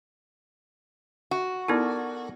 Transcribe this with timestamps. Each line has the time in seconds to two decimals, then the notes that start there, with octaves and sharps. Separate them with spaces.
1.31 F#4
1.68 B3 D#4 E4 A4 A#4 D5